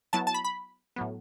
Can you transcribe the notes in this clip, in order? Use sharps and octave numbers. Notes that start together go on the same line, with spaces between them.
F#3 B3 E4 A5
A5
B5
B5
A2 F#3 B3